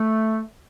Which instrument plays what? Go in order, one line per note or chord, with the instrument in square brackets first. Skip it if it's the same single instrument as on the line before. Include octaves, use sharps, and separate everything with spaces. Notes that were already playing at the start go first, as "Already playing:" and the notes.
Already playing: [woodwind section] A3